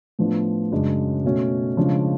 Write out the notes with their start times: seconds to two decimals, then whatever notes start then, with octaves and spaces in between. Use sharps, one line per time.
0.19 A2 F3 B3 D4
0.72 F#2 C#3 G#3 D4
1.24 B2 A3 C#4 F#4
1.77 C#3 F3 G#3 D4